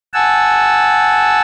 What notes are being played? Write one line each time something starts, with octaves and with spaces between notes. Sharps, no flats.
F#5 G#5 A5 E6